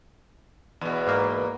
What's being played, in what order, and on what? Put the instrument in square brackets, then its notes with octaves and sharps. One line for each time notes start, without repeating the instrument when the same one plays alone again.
[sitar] E2 B2
[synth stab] G#2 A#3